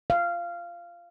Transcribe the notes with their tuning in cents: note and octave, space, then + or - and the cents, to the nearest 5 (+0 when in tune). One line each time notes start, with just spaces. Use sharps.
F5 -15